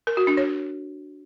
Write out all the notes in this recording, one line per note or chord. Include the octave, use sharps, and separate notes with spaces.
A#4
F#4
D4
C#5